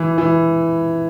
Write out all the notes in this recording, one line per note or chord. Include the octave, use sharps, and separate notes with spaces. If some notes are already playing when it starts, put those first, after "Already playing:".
Already playing: E3
E3